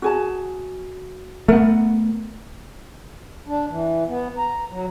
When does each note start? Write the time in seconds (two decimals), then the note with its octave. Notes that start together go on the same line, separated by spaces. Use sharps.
0.02 F#4 G#4 A5
1.48 A3 B3 A#4 F#5
3.47 D4
3.69 E3
4.07 B3
4.38 A#5
4.70 F#3